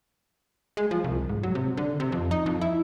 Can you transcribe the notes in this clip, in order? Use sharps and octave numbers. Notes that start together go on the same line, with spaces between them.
G#3
F3
C2
G#2
F#3
C3
D3
C3
F2
D#4
F2
E4